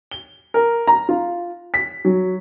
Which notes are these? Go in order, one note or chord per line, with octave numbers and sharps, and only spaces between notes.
G7
A#4
A#5
F4
B6
F#3